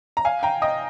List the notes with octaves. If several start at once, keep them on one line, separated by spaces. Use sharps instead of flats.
A#5
F5 G#5
G5 A#5
D#5 G5